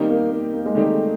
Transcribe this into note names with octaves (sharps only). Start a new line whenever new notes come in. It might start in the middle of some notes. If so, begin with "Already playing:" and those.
Already playing: D#3 G3 A#3 C4 D#4 G4
A#3
A#3
A#3
G#3
D#3 G3 A3 C4 D#4 G4